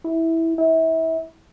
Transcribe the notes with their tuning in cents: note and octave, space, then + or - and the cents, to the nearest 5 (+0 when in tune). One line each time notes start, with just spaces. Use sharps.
E4 -10
E4 -30